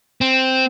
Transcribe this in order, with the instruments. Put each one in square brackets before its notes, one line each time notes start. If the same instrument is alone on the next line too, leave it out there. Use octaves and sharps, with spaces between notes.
[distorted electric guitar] C4